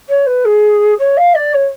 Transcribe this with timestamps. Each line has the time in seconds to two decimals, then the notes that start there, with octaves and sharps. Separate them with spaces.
0.08 C#5
0.26 B4
0.45 G#4
0.98 C#5
1.17 F5
1.34 D5
1.53 C#5